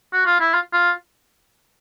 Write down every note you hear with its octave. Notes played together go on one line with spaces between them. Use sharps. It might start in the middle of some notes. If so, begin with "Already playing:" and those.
F#4
F4
E4
F4
F4